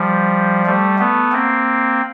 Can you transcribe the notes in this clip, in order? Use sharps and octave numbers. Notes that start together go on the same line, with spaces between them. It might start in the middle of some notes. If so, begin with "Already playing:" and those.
Already playing: F3 G3
G3 A3
A3 B3
A#3 C4